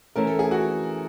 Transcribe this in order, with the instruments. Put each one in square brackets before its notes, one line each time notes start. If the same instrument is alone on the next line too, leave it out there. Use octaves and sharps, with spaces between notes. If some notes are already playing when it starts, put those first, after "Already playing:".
[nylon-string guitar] E3 A3 C#4 [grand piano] A#4
[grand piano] A4
G#4
F#4